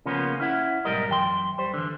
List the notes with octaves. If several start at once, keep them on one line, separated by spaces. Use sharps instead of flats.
C#3 F3 A#3 B3 C#4 F4
C#4 E4 F#5
B1 G#2 G3 A#4 D#5
F#2 E3 G5 C6
G3 C5
D3 E3